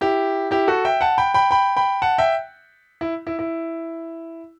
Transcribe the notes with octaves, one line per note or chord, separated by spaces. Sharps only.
E4 G4
E4 G4
F#4 A4
E5 G5
F#5 A5
G5 B5
G5 B5
G5 B5
G5 B5
F#5 A5
E5 G5
E4
E4
E4